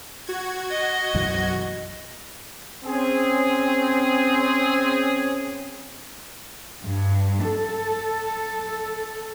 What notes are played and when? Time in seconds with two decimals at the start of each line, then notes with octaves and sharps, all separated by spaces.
0.27 F#4 G#6
0.71 D#5
1.14 B1 F#2 E3
2.85 C4 C#4 G#4
6.84 G2
7.50 A4